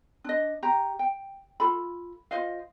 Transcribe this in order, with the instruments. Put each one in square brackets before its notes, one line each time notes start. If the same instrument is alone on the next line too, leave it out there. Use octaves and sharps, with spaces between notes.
[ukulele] D4 D#5
G4 A#5
G5
F4 A4 B5
F4 C5 D#5 F5